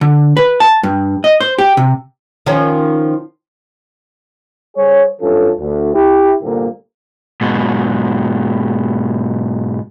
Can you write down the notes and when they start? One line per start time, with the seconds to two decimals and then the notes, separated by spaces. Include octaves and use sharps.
0.01 D3
0.37 B4
0.60 A5
0.83 G2
1.24 D#5
1.40 C5
1.58 G4
1.77 C3
2.46 D#3 F3 C#4
4.76 G3 G#4 C5 C#5
5.21 G2 E3 C#4 F4 A4
5.59 D2
5.94 E4 G4
6.43 G1 C2 A#2 D3 A#3
7.41 G#2 B2